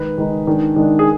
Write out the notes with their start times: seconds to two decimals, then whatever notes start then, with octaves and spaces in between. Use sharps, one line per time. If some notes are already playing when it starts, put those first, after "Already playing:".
Already playing: D#3 G#3 D#4 B4
0.18 D#3 G#3 D#4
0.47 D#3 G#3 D4
0.76 D#3 G#3 D4
0.99 G#4